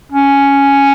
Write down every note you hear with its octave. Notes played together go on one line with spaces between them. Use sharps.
C#4